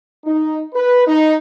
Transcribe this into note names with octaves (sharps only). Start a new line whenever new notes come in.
D#4
B4
D#4